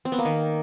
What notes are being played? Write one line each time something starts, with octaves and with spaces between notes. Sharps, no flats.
C4
B3
A#3
D#3